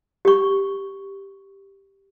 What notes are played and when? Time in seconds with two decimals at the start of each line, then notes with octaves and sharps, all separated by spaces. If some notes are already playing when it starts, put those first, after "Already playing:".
0.25 G4 C#6